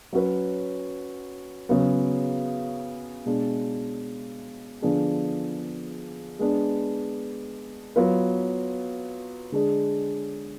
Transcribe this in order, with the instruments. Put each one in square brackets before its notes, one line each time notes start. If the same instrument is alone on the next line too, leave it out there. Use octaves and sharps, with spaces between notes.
[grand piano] F#3 C#4 F#4 B4
C#3 F#3 B3
B2 G#3 D4
D3 F3 B3 D4 G#4
G#3 B3 D4
F#3 B3 F4 B4
D3 G#3 D4 G#4